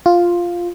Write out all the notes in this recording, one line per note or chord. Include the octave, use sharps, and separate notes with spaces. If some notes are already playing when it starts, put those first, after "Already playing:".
F4